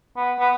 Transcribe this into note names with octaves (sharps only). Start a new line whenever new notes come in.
B3
B3